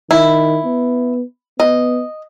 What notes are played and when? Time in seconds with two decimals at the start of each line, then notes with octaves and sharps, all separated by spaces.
0.11 D#3 E4
0.65 B3
1.60 B3 D#5